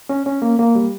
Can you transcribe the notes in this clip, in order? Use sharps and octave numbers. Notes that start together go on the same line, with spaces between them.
C#4
C#4
A#3
A#3
G3